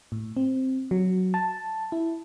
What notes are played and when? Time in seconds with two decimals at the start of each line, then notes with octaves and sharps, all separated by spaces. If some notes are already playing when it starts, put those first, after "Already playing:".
0.12 A2
0.37 C4
0.91 F#3
1.34 A5
1.92 E4